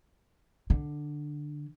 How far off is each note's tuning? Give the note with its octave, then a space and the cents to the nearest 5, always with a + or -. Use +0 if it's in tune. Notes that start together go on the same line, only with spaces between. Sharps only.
D3 +10